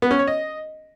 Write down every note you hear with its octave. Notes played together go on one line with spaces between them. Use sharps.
B3
C#4
C#5
D#5